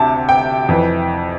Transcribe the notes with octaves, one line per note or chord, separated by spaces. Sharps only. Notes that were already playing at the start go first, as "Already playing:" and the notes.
Already playing: D2 C3 A5
G5
F2 E3